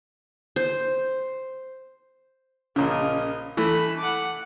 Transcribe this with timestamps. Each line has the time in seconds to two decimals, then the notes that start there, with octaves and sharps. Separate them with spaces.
0.56 C5
2.76 A#1 C#3 A#4 D#5
3.57 E3 A3 A4 B5
3.98 F#5 D6